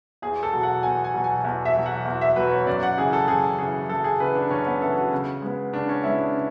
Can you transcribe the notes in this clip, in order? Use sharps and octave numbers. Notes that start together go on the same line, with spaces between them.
E2 G#4
A4
B2 F#3
F#5
E2 G#5
G#5
B2 F#3
G#5
E2
E5
B2 F#3
F#5
E2
E5
B2 F#3 B4
C#5
F#2 D5
F#5
C#3 E3 G#4
A4
F#2 G#4
C#3 E3 G#4
F#2 A4
G#4
C#3 E3 B4
D4
F#2 C#4
B3
C#3 E3 A4
F#4
C#3
G#3 B3
C#3 D4
C#4
G#3 B3 E4
D4
C#3